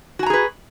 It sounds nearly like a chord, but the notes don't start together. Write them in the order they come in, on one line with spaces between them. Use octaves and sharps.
F#4 G#5 A#5 G#4 B4